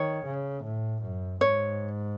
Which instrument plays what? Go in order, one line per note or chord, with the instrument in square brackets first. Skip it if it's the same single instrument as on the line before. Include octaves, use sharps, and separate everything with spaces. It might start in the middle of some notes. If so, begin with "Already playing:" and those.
Already playing: [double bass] D#3 [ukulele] C#5
[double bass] C#3
A2
F#2
[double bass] G#2 [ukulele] C#5